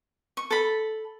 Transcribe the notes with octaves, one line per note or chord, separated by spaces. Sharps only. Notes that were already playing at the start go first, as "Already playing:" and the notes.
C#6
A4 B5